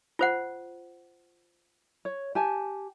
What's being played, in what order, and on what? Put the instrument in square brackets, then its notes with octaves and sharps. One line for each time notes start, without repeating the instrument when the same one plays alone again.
[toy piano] F4 C5 F#5
[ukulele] C#5
G4 G#5 A5